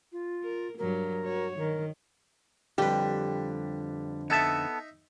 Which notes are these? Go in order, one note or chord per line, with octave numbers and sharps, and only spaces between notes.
F4
A#4
G2 F#3 A#4
F#4 C#5
D#3 A#4
F2 D3 G3 G4 B4
B3 D#4 A4 E5 A5